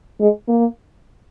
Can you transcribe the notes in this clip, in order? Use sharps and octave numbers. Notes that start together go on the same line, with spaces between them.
G#3
A#3